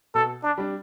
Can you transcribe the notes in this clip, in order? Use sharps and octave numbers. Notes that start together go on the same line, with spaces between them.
B2 A4
D4
G3 D4